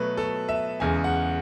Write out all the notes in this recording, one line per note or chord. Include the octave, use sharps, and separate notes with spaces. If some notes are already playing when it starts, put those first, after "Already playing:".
Already playing: B2 F#3 A3 B4
A4
E5
E2 C#3 G#3 G#5
F#5